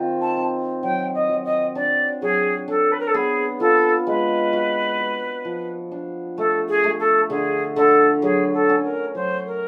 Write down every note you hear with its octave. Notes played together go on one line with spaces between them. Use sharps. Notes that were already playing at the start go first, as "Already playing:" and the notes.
Already playing: D#3 C4 F4
A5
C4
F#3 G5
D#5
F#3
D#5
D4 D5
F#3 G#4
D4 A4
B4
A#4
A4
B3 G#4
F4 A4
G#3 B4
F#4
F#4
F3
D4
A3 A4
G#4
A3
A4
D3 G#4
D3 A4
F#3 G#4
A4
C#4
A#4
F#3 C5
A#4